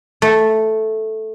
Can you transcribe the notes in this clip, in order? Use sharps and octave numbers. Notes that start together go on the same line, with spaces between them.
A3